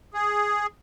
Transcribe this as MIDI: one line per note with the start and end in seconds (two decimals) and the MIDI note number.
0.14 0.67 68